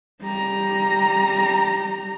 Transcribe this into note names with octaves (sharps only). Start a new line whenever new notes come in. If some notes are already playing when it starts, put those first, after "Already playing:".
G3 A#5